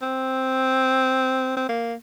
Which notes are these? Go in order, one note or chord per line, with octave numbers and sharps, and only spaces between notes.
C4
C4
A#3